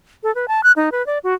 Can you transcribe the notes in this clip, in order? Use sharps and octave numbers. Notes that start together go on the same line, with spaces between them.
A4
B4
A5
F#6
D#4
B4
D5
F#4